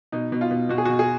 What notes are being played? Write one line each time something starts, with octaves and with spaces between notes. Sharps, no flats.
B2 D#4
B2
F4
B2
B2 F#4
G#4
B2 F#4
G#4